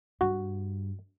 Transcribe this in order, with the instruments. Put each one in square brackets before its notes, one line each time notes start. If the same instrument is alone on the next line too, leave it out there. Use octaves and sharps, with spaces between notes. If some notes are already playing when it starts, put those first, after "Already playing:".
[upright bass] G2 [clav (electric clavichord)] F#4